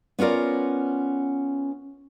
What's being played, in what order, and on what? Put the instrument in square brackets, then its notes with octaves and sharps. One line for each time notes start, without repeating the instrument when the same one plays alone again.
[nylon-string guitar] B3 C#4 F4 A#4 D5